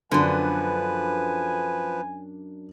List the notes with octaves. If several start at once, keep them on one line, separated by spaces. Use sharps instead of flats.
F#2 D3 F3 B3 C#4 D4 B4 G#5